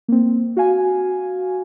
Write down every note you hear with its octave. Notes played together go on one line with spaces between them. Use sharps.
A#3 C4
F#4 F5 G#5